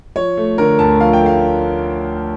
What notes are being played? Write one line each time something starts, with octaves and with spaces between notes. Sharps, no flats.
F3 C#5
A3
D3 A#4
D2 A5
F3 F5
G5
A3 F5